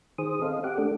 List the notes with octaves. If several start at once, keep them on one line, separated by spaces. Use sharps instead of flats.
D#3 G#4 C5 D#6
C4 A4 D#5 F5
G4 F#5 D6
A3 D4 A4